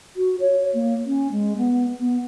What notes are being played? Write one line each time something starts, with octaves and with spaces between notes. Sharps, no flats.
F#4
C#5
A#3
C#4
G#3
B3
B3